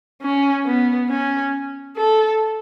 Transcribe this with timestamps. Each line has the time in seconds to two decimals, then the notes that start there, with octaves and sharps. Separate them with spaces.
0.23 C#4
0.66 B3
1.10 C#4
1.97 A4